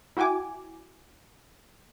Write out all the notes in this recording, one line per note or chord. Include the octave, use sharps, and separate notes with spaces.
E4 F#4 G5 G#5 D6